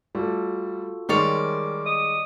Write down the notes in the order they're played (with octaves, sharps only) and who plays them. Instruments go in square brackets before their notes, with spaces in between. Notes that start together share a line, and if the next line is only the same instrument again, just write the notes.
[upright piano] G3 A3 [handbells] F4 F#4 A4
[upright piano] D#3 G3 G#3 [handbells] A#4 [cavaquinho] C#5 D5 C6
[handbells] D#5 [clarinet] D#6